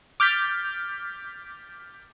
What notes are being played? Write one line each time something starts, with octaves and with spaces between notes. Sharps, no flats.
D6 F6 G6 A6 B6